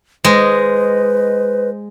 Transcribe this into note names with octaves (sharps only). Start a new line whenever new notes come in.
G#3 B4 C5 D#5